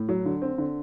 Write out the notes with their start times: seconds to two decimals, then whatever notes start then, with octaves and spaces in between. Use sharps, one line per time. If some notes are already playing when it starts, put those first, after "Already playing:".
Already playing: A2
0.09 F#3
0.25 D3
0.42 C4
0.58 D3